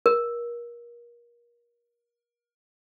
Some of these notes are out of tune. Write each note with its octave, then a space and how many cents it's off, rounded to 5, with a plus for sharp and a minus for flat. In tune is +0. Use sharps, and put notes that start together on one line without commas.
A#4 +30